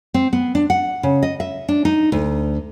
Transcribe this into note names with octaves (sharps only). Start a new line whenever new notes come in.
C4
B3
D4
F#5
C#3
D#5
E5
D4
D#4
D2